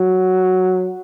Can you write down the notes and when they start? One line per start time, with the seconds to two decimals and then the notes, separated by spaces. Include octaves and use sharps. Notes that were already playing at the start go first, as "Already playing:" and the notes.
Already playing: F#3